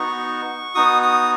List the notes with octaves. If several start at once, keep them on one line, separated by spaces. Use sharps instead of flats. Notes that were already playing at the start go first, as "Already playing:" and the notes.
Already playing: B3 D#4 F#4 C#6
B3 D#4 F#4 D#6
D#6